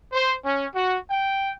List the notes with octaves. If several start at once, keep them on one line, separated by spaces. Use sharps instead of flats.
C5
C#4
F#4
G5